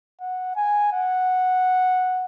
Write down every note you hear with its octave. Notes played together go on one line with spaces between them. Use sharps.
F#5
G#5
F#5